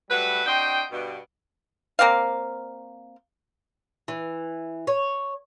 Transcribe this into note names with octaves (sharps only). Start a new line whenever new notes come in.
F#3 G3 A3 F#4 B4
C4 D4 F#4 D#5 G5 C6
G2 B2
A#3 C4 D5 F5
E3
C#5